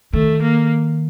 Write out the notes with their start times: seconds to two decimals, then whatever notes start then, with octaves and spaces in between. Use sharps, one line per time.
0.13 D#3 A3
0.42 A#3